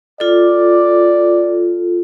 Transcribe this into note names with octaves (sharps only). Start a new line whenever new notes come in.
F4 A4 D5